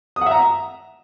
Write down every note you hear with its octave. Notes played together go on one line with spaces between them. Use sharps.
D#6
F#5
E5
A#5